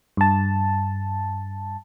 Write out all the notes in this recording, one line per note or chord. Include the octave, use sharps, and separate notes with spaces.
G2 A5